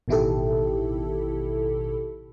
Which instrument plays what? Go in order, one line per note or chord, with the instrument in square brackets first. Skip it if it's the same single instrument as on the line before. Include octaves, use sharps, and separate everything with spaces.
[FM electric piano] A1 B2 D#3 E4 G4 A4